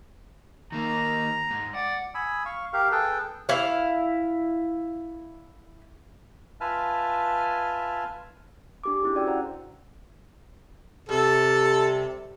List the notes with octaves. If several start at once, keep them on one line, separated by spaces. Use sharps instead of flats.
D#3 A#3 A#5
G#2
D5 F#5
G#5 B5 D#6 E6
F5 C#6
G4 A#4 F5
G#4 A4 B4 G5
E4 F5
F4 B4 E5 G#5 A5 F6
D4 G4 D6
C#4 E4 G#4
F#4 D5 G5 E6
C5 F#5 A#5
C3 G3 A4